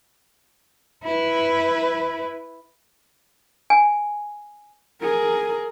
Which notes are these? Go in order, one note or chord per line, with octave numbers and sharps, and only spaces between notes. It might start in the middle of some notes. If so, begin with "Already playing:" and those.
E4 B4
G#5
G#4 A#4